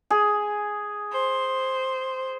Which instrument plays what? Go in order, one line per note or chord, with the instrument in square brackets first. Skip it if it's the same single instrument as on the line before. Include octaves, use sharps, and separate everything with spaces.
[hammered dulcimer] G#4
[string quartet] C5